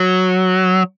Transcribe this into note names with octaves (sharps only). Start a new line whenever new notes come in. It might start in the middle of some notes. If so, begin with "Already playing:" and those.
Already playing: F#3